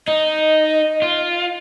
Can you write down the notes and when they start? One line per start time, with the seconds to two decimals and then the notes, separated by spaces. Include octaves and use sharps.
0.08 D#4 D#5
1.02 F4